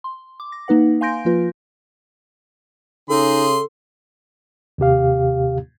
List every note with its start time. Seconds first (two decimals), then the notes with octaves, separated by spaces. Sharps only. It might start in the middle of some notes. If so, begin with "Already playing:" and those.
0.04 C6
0.40 D6
0.52 A#6
0.68 A#3 D#4 B4 F#5
1.01 F5 G#5 C6 G6 A#6 D7
1.25 F3 A#3 F4 B4
3.10 C#3 D#4 G#4 A4 C6
4.78 D#2 C3 G4 F5